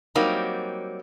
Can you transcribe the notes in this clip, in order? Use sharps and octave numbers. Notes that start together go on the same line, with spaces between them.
F#3 G3 A#3 C4 D#4